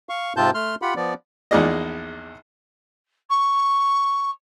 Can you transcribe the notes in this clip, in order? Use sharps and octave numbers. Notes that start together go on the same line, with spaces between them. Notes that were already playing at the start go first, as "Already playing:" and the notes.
F5 C#6
G#2 C3 C4 F4 A5 G6
A3 C6 F6
F4 G4 F#5 B5
F3 B3 D5
A#1 E2 D#4 G#4 D5 D#5
C#6